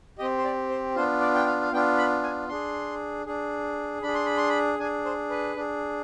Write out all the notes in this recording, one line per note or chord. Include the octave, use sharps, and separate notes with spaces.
C4 G4 D#5
C5
D5
C5
B3 D4 F4 C5
D5
G5
F5
F5
B3 D4 F4 G5
B5
G#5
D4 G#4 C6
D4 G#4
D4 G#4 B5
C6
B5
C6
B5
D4 G#4 G#5
C5
B4
D4 G#4